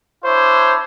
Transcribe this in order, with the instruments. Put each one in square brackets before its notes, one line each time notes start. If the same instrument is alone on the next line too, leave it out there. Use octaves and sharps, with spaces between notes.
[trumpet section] D4 E4 C#5 [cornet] C5